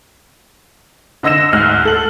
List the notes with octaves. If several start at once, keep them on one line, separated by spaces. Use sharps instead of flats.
D3 D#5 E6 A#6 E7
D2 G#2 F6 F#6
A4 F#7